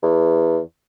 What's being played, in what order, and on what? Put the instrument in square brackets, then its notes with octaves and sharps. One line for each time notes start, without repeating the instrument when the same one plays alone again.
[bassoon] E2